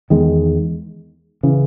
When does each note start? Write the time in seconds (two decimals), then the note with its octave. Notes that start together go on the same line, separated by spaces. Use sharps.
0.10 E2 D#3 G#3
1.43 C#3 E3